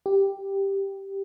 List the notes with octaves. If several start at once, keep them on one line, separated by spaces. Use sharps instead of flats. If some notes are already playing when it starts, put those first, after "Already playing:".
G4